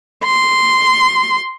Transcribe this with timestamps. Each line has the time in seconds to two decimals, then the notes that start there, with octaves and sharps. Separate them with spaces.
0.23 C6